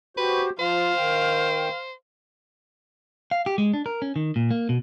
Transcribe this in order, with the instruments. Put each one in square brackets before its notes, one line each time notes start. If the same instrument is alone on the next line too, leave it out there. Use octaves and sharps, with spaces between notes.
[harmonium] F#4 G4 C5 [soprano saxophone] B4
[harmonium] F3 F4 [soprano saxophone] C5 [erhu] F5
[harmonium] D#3 G5
[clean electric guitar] F5
G4
G#3
D4
A#4
C#4
D#3
A#2
A#3
B2